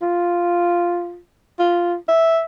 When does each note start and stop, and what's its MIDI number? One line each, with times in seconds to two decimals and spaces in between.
0.02 1.18 65
1.59 1.95 65
2.08 2.43 76